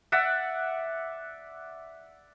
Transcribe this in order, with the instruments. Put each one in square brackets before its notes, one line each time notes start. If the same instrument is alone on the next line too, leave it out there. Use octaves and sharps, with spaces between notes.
[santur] D5 E5 F#5